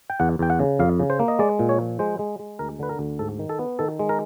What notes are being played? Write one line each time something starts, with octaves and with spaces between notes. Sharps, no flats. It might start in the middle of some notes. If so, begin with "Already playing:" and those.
G5
E2 F#5
E2 G5
F#5
C#3
F2 F5
C#3
C5
A#3
D#5
G#3 D5
A#2
C#5
F3
G#3 C5
G#3
G#3
D2 A#4
D3 B4
A#4
D2
G#2 A4
D#3
A4
B3
D#3 A4
G#3
A#4